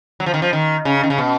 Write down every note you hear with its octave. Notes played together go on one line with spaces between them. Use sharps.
F#3
F3
D#3
F3
D#3
C#3
D#3
C#3
B2